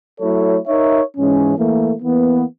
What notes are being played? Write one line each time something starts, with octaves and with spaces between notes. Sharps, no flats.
F#3 A3 E4 A4 C#5
D#4 A#4 C#5 E5
G#2 E3 G#3 C#4
E3 A3 A#3
E3 A#3 B3